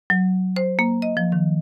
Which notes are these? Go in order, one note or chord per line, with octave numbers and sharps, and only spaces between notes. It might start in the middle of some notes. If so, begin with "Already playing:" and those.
F#3
C5
A#3
D#5
F3
D#3